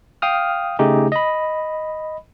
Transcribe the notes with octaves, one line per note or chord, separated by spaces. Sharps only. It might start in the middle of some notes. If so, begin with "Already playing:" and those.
F5 G5 D#6 F6
C#3 A3 D#4 G4 G#4
D#5 B5